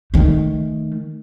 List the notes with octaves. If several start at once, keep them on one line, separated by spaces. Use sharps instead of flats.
D#3 A3